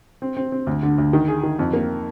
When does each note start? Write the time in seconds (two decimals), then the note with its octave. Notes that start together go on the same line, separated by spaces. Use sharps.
0.22 C4
0.37 C4
0.52 C4
0.67 D2
0.83 D3
0.98 D2
1.13 D#3
1.28 G#4
1.43 D#3
1.59 F2
1.73 A#3